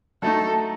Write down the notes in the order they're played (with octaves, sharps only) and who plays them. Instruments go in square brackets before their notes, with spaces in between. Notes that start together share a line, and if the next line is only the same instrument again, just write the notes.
[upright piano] F#3 A3 D#4 [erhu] A4